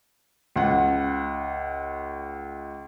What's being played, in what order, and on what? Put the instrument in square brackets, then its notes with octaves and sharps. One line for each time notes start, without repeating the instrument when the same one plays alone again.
[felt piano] C#2 F#5